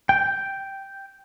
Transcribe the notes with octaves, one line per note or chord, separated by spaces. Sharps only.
G5